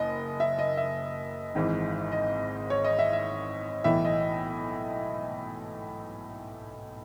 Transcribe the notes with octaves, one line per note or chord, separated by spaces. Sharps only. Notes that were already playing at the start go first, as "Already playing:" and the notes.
Already playing: F#1 D#5
E5
D#5
E5
G#1 G#2 E3
D#5
C#5
D#5
E5
E5
B1 A2 E3 E5
D#5